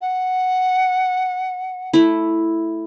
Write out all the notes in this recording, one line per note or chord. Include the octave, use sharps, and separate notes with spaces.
F#5
A3 E4